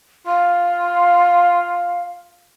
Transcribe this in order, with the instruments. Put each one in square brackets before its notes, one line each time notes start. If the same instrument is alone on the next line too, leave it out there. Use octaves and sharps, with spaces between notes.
[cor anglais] F4 [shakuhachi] F5